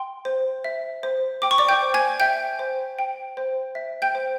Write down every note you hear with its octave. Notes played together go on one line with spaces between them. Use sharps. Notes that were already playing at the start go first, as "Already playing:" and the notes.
Already playing: G5 C6
C5
E5
C5
G5 D6
C#6
D5 D6
G5 G6
C5
G#5 G#6
E5 G5 G6
C5
G5
C5
E5
G5 G6
C5